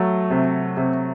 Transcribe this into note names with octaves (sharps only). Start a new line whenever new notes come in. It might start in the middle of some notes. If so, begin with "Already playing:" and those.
Already playing: F#3 A3
C3
C3